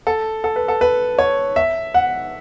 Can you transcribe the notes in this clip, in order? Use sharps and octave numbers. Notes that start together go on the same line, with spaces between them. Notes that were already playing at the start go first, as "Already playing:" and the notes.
A4
A4
B4
A4
B4
C#5
E5
F#5